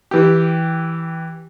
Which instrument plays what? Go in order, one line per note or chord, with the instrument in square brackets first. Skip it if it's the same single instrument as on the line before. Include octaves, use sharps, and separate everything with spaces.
[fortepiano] E3 G4